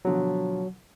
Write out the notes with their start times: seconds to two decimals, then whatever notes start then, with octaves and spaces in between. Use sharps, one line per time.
0.05 B2 D3 F3 F#3